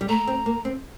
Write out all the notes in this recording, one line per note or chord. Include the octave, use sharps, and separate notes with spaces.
G3
A3 A#5
C4
A#3
C4